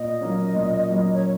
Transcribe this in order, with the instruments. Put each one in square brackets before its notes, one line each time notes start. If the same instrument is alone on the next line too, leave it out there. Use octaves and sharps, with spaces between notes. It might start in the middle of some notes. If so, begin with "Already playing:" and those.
Already playing: [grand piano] A#2 [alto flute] D#5
[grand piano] F#3 A#3 C#4
A#2
F#3 A#3 C#4
[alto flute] C#5